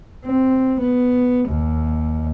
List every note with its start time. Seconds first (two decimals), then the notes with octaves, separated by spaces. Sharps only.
0.25 C4
0.79 B3
1.48 D#2